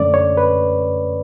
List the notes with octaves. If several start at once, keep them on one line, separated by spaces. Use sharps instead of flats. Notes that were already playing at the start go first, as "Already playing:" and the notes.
Already playing: F#2 D3 A3 C#4 D5
C#5
B4